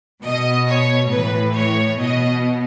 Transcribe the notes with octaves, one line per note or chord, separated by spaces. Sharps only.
B2 D#5
C#5
A2 E3 B4
C#5
B2 D#5